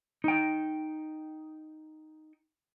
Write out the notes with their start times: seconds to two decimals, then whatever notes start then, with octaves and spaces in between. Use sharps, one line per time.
0.24 D#4 G5